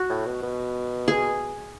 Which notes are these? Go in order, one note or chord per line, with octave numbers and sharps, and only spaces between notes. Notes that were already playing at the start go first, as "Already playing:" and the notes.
Already playing: F#4
A2
B2
B2
G#4